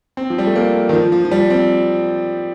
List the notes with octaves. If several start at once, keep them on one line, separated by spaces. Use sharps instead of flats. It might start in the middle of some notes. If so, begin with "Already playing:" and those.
C4
F3
G3
A3
A#3
D#3
F3
F3
F3
G3
C4